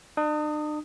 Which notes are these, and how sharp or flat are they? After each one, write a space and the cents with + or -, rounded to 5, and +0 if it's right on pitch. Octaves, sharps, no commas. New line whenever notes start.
D4 +45 D#6 +0